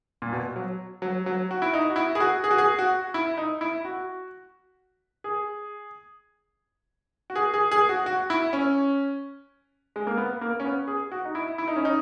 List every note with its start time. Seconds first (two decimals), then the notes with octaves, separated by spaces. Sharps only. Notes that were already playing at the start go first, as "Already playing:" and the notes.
0.22 A#2
0.33 B2
0.56 F#3
1.02 F#3
1.26 F#3
1.51 F#4
1.62 E4
1.74 D#4
1.90 F#4
1.96 E4
2.15 G#4
2.20 F#4
2.44 G#4
2.51 F#4
2.58 G#4
2.79 F#4
3.14 E4
3.37 D#4
3.61 E4
3.85 F#4
5.24 G#4
7.30 F#4
7.35 G#4
7.54 G#4
7.71 G#4
7.89 F#4
8.06 F#4
8.30 E4
8.53 C#4
9.96 G#3
10.07 A#3
10.17 B3
10.41 A#3
10.60 C#4
10.65 B3
10.87 G#4
11.12 F#4
11.25 D#4
11.35 E4
11.58 E4
11.67 D#4
11.76 C#4
11.85 D#4